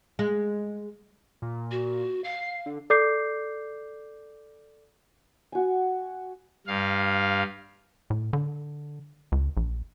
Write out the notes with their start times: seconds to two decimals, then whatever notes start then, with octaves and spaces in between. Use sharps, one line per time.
0.19 G#3
1.42 A#2
1.71 F#4
2.24 F5 C7
2.66 D3
2.90 A4 D5 D6 G6 C7
5.52 F#4 G#5
6.67 G2 F5
8.10 A2
8.33 D3
9.32 C#2
9.57 A#1